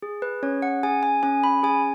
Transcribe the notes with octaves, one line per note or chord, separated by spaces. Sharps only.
G#4
B4
C#4 C#5
F#5
G#4 G#5
G#5
C#4 G#5
B5
G#4 G#5